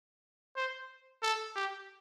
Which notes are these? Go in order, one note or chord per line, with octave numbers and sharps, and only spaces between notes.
C5
A4
G4